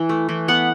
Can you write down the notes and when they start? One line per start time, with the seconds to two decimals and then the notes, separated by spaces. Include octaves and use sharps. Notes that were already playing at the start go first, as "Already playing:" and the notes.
Already playing: E3
0.09 A3
0.29 E3
0.48 B3 F#5